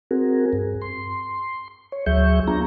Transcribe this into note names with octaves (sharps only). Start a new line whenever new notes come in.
C4 F#4 G#4 A#4
G2
C6
C#5
D2 F#3 G#4 E5 C#6 G6
B3 D4 F4 G#4 A#5